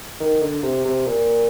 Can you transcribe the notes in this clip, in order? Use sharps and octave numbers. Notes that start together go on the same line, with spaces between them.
D#3
D3
C3
C3
A#2